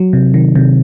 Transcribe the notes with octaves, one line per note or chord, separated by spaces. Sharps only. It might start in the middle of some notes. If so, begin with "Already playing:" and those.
Already playing: F#3
C3
D#3
C3